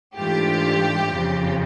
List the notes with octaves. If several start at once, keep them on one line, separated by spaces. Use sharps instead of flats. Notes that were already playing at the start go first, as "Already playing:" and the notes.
G#2 E3 A3 D4 F4 G4
F2 C#3 F3